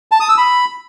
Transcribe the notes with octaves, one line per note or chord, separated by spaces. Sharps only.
A5
D#6
E6
B5